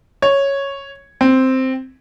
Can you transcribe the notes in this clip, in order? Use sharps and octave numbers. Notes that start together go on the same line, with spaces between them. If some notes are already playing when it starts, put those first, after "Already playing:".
C#5
C4